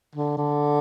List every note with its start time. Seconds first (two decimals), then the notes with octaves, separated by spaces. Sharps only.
0.15 D3
0.37 D3